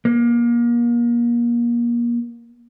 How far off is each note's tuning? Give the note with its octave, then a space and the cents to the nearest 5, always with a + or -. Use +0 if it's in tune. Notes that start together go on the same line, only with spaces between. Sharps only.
A#3 +30